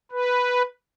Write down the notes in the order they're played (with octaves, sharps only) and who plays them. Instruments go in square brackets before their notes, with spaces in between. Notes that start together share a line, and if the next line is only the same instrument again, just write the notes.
[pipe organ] B4